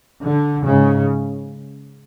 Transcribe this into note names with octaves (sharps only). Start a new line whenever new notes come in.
D3
G#2 C#3